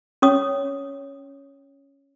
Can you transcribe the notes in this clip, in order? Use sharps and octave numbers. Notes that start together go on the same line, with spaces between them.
C#4 C#5 D#6